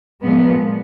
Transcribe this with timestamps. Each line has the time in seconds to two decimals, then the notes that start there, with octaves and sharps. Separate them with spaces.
0.22 A#2 F3 G#3 B3